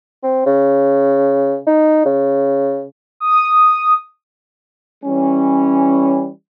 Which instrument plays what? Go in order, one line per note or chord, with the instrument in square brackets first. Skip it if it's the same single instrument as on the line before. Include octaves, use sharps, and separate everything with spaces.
[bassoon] C4
C#3
D#4
C#3
[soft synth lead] D#6
[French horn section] E3 G3 C#4